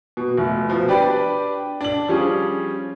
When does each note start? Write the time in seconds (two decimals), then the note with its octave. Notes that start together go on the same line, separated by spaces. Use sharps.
0.17 B2
0.38 F1
0.69 B2 F3
0.88 D4 G4 B4 D5
1.81 D4 F#7
2.09 F3 G3 C#4 F4 G#4